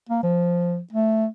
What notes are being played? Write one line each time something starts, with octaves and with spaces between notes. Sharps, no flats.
A#3
F3
A3